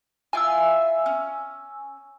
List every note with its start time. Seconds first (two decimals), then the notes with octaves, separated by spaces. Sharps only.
0.33 E4 F4 G#5 E6
1.06 C#4